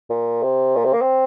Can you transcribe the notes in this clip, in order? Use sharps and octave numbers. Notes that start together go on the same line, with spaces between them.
A#2
C3
A#2
C3
A#3
C4